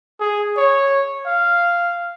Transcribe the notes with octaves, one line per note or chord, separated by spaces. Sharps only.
G#4
C#5
F5